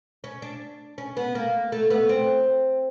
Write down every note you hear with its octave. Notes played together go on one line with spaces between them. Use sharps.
C#4
D4
C#4
B3
A#3
A3
B3
C4